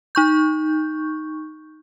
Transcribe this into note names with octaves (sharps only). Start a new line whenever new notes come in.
D#4 C#6 G6